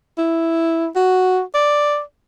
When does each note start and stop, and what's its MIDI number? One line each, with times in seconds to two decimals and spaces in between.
0.18 0.87 64
0.96 1.41 66
1.54 2.01 74